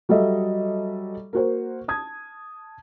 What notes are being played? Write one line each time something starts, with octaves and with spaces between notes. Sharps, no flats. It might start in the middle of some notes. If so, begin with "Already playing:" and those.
F#3 G3 A4 D#5 E5
A#3 F#4 C5
A5 D#6 G#6